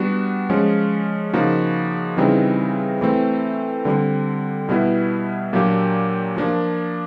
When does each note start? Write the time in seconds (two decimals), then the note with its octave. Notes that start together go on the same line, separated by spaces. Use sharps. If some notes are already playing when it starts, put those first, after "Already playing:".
Already playing: G3 B3 D4 F#4
0.49 F3 G#3 C#4
1.33 C#3 F3 A#3 D#4 F#4
2.17 C#3 E3 G3 C4 D#4
3.01 E3 A3 C4
3.85 D3 G3 C4
4.69 B2 G3 B3 E4
5.53 A#2 F#3 A#3 D4 G4
6.37 F3 A#3 D4